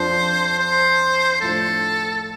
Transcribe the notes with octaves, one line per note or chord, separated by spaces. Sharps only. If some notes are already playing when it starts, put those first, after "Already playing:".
Already playing: F2 F3 D4 C5
C5
A2 F3 A3 D4 A4